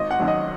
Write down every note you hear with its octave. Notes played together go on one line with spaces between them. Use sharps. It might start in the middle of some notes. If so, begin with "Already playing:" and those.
Already playing: G#1 D#5
F#5
F#2 D#3 F#3
D#5